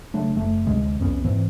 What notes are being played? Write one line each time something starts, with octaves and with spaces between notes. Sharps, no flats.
C#3 F#3 A3 D4
F#1 A3
D2 C3 G#3
C2 F2 B3 C#4
G#2 E3 C4